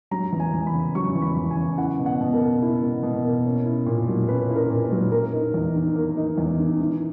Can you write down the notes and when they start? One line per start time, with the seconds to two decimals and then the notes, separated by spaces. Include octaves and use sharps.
0.11 F#3 A#5
0.33 E2
0.40 G#5
0.54 E2
0.67 B5
0.74 C#3
0.95 F#3 C#6
1.15 E2
1.22 B5
1.37 E2
1.51 G#5
1.57 C#3
1.78 E4 F#5
1.99 B2
2.06 F#5
2.21 B2
2.34 A#4
2.41 A#3
2.62 E4
2.82 B2
3.03 B2
3.24 A#3
3.46 C#4
3.65 E4
3.86 A#2
4.08 F#3
4.28 C#4 B4
4.50 E4
4.56 A#4
4.70 A#2
4.84 B4
4.92 F#3
5.12 A#3 A#4
5.33 D#4
5.54 E2
5.75 D#3
5.96 A#3
6.17 D#4
6.38 E2
6.58 D#3
6.79 E3